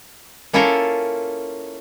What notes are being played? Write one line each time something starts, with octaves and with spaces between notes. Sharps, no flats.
A#3 C#4 E4 F4 A4 A#4